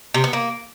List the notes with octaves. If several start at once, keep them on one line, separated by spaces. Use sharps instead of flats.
C3
B3
A#3